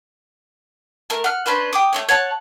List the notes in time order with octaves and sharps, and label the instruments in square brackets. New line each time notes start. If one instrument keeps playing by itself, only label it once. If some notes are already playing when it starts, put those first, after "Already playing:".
[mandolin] A3 A#4
F#5 F6
C#4 D4 B4 C5
G5 D6 D#6
A3 C#4 C#5
C#5 F#5 A5